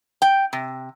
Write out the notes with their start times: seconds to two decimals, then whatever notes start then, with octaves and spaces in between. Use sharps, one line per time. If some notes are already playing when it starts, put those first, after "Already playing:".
0.22 G5
0.53 C3